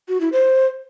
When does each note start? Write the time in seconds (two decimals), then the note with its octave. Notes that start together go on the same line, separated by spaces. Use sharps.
0.09 F#4
0.21 E4
0.32 C5